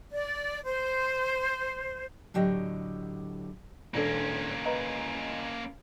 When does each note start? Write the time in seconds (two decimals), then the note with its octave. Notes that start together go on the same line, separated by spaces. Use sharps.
0.11 D5
0.65 C5
2.34 A2 D3 F#3 G4 D#5
3.94 E1 A#3 C#4 D4 A4
4.65 B4 D#5 A#5